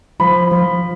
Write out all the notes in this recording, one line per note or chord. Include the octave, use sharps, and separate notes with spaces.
F3 B5
F3